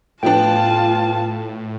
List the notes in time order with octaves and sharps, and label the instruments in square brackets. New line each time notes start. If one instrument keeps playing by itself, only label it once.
[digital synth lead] A2 [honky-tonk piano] F3 B3 D4 [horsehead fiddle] F4 A5 [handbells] G5